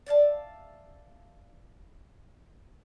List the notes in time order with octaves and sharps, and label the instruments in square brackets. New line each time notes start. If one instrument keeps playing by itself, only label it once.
[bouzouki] D5 E5 F5 A5